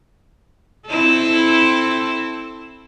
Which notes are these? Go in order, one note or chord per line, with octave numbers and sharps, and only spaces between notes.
C4 E4 A4